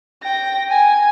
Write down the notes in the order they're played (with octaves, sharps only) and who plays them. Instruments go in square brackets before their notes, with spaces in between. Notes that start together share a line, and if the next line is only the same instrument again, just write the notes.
[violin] G5 A#6
G#5